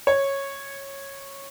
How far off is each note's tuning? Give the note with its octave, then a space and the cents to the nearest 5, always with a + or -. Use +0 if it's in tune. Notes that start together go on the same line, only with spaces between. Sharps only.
C#5 -10